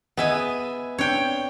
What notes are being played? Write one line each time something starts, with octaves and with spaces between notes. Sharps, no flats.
B3 G#4 D#5 E5 G#5
C4 D4 C#5 G5